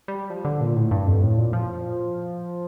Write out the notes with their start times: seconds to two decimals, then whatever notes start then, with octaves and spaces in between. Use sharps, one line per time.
0.08 G3
0.30 F3
0.45 D3
0.61 A#2
0.76 A2
0.91 G2
1.08 F2
1.23 A2
1.38 A#2
1.53 F3